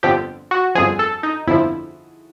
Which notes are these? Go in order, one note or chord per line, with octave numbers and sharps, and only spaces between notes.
G1 F2 D3 F3 G4
F#4
G1 F2 D3 F3 G#4
A4
D#4
G1 F2 D3 F3 E4